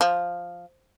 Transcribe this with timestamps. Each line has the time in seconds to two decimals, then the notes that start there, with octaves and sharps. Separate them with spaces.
0.01 F3